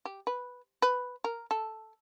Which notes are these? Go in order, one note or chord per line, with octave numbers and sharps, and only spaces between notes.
G4
B4
B4
A#4
A4